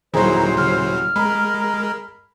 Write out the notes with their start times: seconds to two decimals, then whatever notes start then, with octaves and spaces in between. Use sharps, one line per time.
0.14 D#1 D#3 F#3 E4 G#4 C5 A#5
0.58 C#3 F#3 F6
1.16 G#3 A#4 B5